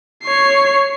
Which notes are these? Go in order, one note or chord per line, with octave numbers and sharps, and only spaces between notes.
C#5 C7